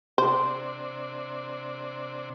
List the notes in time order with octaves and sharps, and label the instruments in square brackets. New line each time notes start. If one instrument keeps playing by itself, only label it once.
[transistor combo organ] C3 D4 [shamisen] C5